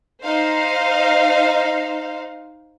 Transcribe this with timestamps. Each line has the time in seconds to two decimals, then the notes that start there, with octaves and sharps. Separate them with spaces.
0.23 D#4 C5 F5